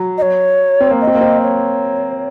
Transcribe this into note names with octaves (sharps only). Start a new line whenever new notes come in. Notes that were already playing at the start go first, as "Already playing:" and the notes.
Already playing: F#3
D#5
C#5
C4
A#3
D#5
C4
A#3
C4
C#5